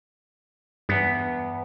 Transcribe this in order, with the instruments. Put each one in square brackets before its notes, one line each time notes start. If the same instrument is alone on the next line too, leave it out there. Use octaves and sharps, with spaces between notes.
[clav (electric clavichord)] E2 B3 [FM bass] G2